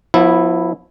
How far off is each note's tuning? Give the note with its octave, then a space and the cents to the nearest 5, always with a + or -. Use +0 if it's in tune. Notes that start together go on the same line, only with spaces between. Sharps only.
F3 +35 B3 -5 E4 +0